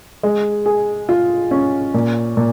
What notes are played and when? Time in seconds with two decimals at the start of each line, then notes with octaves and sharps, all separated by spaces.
0.23 G#3
0.66 G#4
1.09 F4
1.51 C#4
1.94 A#2
2.37 A#2